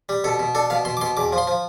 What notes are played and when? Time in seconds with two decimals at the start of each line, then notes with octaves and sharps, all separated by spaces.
0.09 G3
0.24 B2 A4
0.39 B2
0.55 D4 A4
0.70 B2 F5
0.85 B2 C6
0.97 D6
1.01 B2 C6
1.17 E2 D6
1.33 F3
1.38 C6
1.48 F3